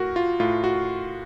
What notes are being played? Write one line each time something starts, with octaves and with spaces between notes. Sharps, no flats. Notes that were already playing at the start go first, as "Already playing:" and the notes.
Already playing: A2 F#4 A#4
F4
A2 F4
F#4